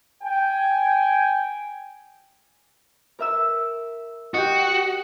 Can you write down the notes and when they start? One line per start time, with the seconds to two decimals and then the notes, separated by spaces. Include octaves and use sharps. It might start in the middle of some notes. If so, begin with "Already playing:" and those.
0.23 G5 G#5
3.19 A#4 E5 E6
4.34 F#4 G4 D#5